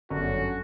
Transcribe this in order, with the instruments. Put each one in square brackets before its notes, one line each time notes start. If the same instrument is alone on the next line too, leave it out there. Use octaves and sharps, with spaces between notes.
[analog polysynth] G1 F#2 D3 F#3 C#4 [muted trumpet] F#4